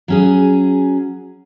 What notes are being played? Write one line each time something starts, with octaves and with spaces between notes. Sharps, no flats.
F#3 C#4 G#4